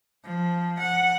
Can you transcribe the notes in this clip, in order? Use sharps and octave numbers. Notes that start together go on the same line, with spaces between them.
F3
F#5